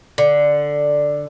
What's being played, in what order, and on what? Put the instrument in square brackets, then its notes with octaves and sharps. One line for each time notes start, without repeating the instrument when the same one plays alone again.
[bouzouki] D3